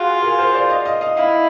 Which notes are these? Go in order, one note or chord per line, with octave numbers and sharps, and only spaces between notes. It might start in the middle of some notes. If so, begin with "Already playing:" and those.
Already playing: F4 F#4 G#4
G#4 A#4
A#4 C5
C5 D5
D#5 F5
D#5 F5
D#5 F5
E4 D#5 F5